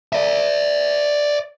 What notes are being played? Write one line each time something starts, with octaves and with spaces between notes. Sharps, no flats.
D5 E5